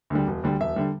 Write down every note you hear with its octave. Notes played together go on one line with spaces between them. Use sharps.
D2 D3 G3
E1
D2 D3 G3
E1 E5
D3 G3